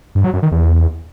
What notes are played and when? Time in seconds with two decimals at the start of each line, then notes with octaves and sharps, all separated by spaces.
0.15 G2
0.24 F#3
0.33 F#2
0.43 D#3
0.52 E2